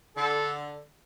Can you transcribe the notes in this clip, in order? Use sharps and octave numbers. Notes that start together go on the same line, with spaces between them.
D3 A4